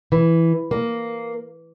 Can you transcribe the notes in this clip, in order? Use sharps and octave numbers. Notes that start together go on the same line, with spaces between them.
E3
A#3